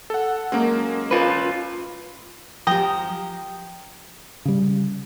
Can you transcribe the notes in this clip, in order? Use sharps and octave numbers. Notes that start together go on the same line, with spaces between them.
A4 F#5
F#2 G#3 A#3 D#4
F4 B4
F3 G4 G5 A#5 D#6
C#3 G3